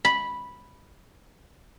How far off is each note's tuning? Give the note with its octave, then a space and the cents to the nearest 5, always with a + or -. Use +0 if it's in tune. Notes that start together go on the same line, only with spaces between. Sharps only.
B5 -5